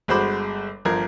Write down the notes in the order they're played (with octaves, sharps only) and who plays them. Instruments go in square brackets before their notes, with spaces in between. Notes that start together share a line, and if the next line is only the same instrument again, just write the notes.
[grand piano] G1 G#3 F#4 C5 B5 D6
G1 F3 A#4 G#6